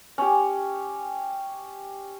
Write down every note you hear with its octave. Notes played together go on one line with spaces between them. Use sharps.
C#4 G4